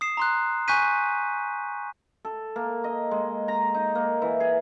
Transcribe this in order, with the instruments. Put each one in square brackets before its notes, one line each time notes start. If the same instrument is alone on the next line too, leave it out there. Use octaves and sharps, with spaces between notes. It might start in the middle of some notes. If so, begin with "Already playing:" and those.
[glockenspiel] D#6 C7 E7
A#5 C6 F#6
G#5 C#6 F#6 G6 B6 D#7
[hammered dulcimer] A4
A#3
D#5
G#3
A#5
D#4
A#3
E3
G#4